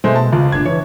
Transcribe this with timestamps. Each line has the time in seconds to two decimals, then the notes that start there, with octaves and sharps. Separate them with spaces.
0.04 B2 G#3 A3 C5
0.16 A5
0.33 C#2 F4
0.52 F#1 D4 G#6
0.66 E3 C#5